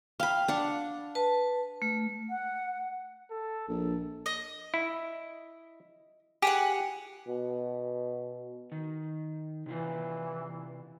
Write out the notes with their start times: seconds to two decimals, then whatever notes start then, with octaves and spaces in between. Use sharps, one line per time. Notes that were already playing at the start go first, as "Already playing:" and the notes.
0.20 F5 G5 B5
0.48 D4 F5 F#5
1.15 B4 A5
1.82 A3
2.29 F#5
3.31 A4
3.68 A#1 A4
4.26 D#5
4.74 E4
6.42 G4 G#4 B4 F#5
7.27 B2
8.72 D#3
9.66 C3 E3 E4 F4